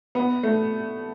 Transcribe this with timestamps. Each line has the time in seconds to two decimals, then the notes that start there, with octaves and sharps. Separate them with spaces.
0.15 B3
0.43 A3